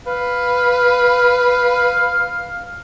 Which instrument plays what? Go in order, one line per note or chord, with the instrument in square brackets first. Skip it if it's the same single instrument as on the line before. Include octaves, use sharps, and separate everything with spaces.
[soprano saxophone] B4 [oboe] F5